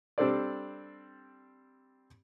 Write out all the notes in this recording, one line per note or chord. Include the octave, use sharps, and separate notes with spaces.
G3 C4 D4 A4 C5 D5